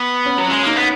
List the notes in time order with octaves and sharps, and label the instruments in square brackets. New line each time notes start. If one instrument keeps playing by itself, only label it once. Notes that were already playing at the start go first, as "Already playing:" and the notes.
Already playing: [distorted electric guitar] B3
[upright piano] C#4
[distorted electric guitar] F#3
[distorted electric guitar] G#3 [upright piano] C#4
[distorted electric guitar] A#3 [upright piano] D#4
[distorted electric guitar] B3